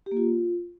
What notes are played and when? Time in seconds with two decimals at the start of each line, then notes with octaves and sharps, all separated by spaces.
0.06 G4
0.12 A#3
0.17 F4